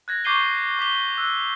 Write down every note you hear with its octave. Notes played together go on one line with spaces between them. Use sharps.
F#6 G#6 A#6
C#6 D6 G6 C7 D#7 G7
D6 B6 G7
E6 F#6